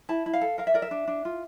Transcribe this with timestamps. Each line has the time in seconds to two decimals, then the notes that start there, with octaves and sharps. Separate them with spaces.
0.09 E4 A5
0.26 E4
0.34 F5
0.41 A4
0.58 A#4 F5
0.67 E5
0.74 A#4 D5
0.82 E5
0.91 D4
1.08 D4
1.25 F4